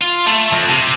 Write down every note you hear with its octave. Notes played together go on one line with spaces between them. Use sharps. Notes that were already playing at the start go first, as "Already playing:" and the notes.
F4
A3
F2
C3